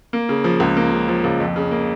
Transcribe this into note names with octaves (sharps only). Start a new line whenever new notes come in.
A#3
C#3
F3
C#2
A#3
C#3
F3
C#2
F2
C#3
A#3